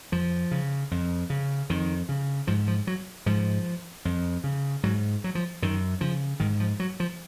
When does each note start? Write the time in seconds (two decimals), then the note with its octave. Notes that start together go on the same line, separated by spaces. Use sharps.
0.12 F2 F3
0.51 C#3
0.91 F2
1.30 C#3
1.70 F2 D#3
2.09 C#3
2.47 G#2 F3
2.68 F3
2.87 F#3
3.26 G#2 F3
4.05 F2
4.44 C#3
4.83 G#2 F#3
5.24 F#3
5.35 F3
5.62 F#2 D#3
6.01 C#3 F3
6.40 G#2 D#3
6.60 F3
6.80 F#3
7.00 F3